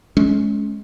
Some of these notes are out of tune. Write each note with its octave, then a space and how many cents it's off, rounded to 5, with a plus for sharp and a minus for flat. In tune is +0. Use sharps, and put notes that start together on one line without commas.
G#3 +30 C#4 +10